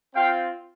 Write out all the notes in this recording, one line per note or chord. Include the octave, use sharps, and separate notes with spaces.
C4 F4 F5 G5